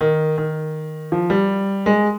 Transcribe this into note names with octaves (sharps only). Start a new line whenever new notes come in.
D#3
D#3
F3
G3
G#3